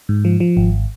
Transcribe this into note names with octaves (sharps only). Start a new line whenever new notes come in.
G#2
F3
F3
G#1